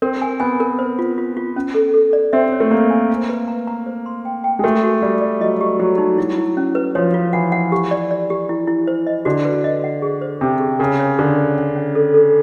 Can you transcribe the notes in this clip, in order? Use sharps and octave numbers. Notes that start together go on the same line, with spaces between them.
C4 A#4
G#5
B3 G#5
A#4
C5
F4
F4
F4
C#4
A4
A4
D5
C4 E5
C#5
A3
A#3 C#5
G#5
F5
B4
A#5
A#5
C5
C6
G5
G5
G#3
A3 F#4
F#4
G3 D5
D5
F#3 D#5
G4
F#3 G4
D#4
F#3 E4
E4
C#4
B4
F3 C#5
F4
E3 F#5
F#5
G4
D5
D5
G4
E4
E4
C5
D#5
D3 F#4
B4
D#5
F#5
G#4
C5
C3 D4
G#4
C#3 A#4
C#5
D3 A#4
A#4
C#4
C#4
A4
A4